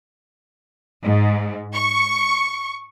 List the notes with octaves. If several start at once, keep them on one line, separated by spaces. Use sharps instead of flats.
G#2
C#6